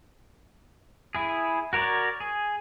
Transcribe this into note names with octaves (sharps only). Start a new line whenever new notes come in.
E4 G#4
F#4 A#4 C#5 D5
G#4